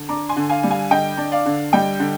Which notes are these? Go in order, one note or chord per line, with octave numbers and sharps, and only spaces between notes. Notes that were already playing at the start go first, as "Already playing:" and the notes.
Already playing: D3
D4 A#5 D6
G#5 C6
D3
F5 G#5
G3
F5 G#5
D3 D#5 G5
D4
D5 F5
D3
G3 D#5 G5
D3